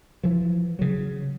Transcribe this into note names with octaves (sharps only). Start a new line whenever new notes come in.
E3 F3
C#3 F#3